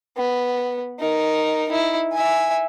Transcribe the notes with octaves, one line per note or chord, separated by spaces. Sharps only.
B3
D#4 A#4
D#4 E4
E5 G#5